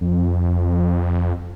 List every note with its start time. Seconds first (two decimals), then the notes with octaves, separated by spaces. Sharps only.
0.01 F2